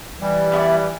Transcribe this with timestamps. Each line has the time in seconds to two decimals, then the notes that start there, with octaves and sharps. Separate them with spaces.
0.21 E3 G3
0.52 B3 E4 A4 D5